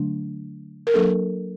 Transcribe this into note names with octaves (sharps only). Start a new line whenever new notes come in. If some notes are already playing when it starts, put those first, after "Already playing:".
Already playing: D3 F#3 A3 D4
A#4
F#3 A#3 D4 A4